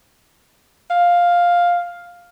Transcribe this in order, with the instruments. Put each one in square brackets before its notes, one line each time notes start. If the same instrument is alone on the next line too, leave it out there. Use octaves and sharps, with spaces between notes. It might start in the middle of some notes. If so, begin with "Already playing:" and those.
[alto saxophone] F5